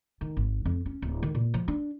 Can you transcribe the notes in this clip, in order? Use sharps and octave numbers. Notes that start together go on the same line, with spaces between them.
D#3
G#1
F2
C#4
D1
D#3
A#2
F3
D4